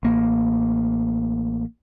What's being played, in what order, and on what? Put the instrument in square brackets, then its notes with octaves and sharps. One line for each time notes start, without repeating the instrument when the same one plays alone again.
[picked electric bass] A1 A#3